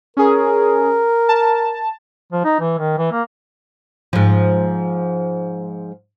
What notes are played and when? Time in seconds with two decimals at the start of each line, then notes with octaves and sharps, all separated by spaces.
0.17 C#4 G#4 A#4
1.29 A5
2.32 F3
2.44 D#4
2.60 E3
2.78 D#3
2.98 E3
3.12 A#3
4.13 G#2 F3